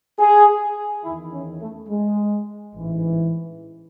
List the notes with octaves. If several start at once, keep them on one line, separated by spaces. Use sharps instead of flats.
G#4
D#3 E4
E2
C#4
A3
G#3
A1 G#2 E3